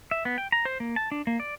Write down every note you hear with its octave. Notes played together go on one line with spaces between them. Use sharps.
E5
B3
G5
A#5
C5
A#3
A5
D4
A#3
D5